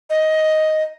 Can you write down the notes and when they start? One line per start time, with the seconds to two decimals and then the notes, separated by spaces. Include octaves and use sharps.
0.10 D#5